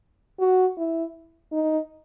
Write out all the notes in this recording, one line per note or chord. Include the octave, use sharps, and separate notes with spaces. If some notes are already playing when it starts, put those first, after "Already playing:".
F#4
E4
D#4